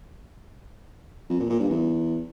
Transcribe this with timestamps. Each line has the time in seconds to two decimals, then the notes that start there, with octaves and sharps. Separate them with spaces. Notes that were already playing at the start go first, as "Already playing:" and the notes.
1.30 F2
1.40 A#2
1.50 A#2
1.60 G2
1.70 E2